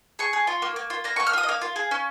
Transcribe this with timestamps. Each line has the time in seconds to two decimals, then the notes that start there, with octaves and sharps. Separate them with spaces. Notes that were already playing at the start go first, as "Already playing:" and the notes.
0.19 G#4 C#6
0.33 G#4
0.47 F4
0.62 A#3
0.76 A#3
0.90 F4
1.04 A#3 A#5
1.16 A#3 C#6
1.27 F6
1.33 F4 D#6
1.43 D#5
1.48 A#3 F5
1.61 F4
1.76 G#4
1.91 C#4